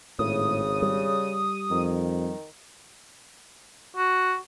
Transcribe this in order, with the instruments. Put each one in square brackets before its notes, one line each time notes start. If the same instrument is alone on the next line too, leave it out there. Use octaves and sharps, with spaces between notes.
[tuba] G#1 [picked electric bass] A2 [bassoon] C#3 [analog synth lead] D#6
[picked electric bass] G3
[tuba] F2 [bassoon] D#3
[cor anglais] F#4